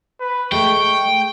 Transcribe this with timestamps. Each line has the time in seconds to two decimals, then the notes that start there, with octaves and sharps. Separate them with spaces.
0.20 B4
0.52 G#3 A3 G5 C#6